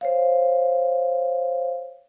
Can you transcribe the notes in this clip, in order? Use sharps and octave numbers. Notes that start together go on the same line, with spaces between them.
C5 C#5 F5